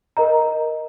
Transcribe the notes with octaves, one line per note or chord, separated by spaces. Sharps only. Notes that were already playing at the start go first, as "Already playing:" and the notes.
A#4 D#5 A#5